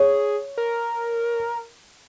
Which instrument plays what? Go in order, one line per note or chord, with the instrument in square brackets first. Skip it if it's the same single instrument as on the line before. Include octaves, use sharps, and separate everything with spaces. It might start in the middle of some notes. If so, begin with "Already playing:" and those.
Already playing: [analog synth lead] G#4 [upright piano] C#5
[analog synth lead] A#4